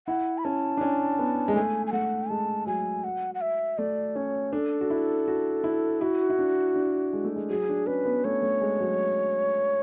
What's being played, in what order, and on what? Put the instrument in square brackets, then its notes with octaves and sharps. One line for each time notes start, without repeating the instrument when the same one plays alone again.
[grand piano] E4 [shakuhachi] F#5
[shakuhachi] B5
[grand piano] C#4 [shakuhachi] A5
[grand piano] D4
C#4
B3
G#3
[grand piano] A3 [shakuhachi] G#5
[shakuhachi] G#5
[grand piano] A3 [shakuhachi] F#5
[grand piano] G#3 [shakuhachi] A5
[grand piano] F#3 [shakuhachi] G#5
[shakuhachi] F#5
F#5
E5
[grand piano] A3 [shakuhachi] D5
[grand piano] C#4 [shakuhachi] C#5
[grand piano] D4 [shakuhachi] A4
[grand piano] F#4
E4
F#4
E4
[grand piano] E4 [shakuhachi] F#4
[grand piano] E4
D4
D4
G#3
A3
G#3
[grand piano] F#3 [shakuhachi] G#4
[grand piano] D4
[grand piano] C#4 [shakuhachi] B4
[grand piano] B3
[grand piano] A3 [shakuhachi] C#5
[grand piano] A3
G#3
F#3